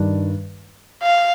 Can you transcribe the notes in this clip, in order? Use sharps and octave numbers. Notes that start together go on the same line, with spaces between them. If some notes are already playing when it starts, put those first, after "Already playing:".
Already playing: G2 D#3 G3 D4
F5